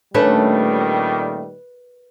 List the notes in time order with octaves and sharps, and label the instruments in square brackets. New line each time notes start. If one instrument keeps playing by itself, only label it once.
[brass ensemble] A#2 D#3 G3 [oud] A3 C#4 D4 [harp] B4